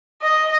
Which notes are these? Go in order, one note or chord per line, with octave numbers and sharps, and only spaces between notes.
D#5